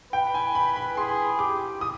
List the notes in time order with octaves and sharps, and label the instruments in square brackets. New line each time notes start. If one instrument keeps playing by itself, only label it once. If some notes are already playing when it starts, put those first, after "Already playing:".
[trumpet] B4 [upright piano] G5
[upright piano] G#5
B5
B5
[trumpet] G#4 [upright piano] C6
[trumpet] G4 [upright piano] D6
[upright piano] D#6